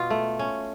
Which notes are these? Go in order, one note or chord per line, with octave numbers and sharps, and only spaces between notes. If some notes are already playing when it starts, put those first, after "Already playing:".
Already playing: B2 F4
A3
C#4